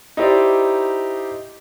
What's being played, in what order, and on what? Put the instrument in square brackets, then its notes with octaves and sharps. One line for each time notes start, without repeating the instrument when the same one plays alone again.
[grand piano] D#4 E4 G4 C5 D5